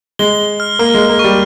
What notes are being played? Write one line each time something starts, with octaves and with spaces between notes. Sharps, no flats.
G#3 G7
G7
F6
A#3 F6
G#3 F6
A#3
G3 C#6